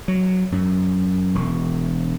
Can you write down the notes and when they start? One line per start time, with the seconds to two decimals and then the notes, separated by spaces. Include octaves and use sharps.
0.08 F#3
0.52 F#2
1.35 E1